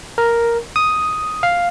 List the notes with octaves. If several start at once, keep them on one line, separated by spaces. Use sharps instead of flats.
A#4
D#6
F5